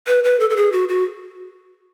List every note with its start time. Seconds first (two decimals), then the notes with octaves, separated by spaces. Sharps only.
0.07 B4
0.24 B4
0.40 A4
0.50 A4
0.56 G#4
0.72 F#4
0.89 F#4